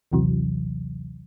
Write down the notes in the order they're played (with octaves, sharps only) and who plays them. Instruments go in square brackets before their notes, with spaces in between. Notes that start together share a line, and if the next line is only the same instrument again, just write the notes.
[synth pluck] A#1 D#2 C3 E3 F#3